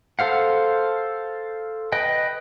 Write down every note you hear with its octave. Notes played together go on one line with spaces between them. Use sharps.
A4 C5 F5 F#5
B4 D#5 G5